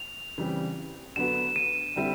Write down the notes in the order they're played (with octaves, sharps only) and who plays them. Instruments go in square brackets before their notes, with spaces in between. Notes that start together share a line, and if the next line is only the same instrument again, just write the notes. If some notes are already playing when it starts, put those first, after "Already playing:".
Already playing: [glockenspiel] F7
[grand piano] C#3 E3 G3 C4
[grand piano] D3 F#3 B3 [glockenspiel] E7
[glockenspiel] D#7
[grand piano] D3 G3 C4 E4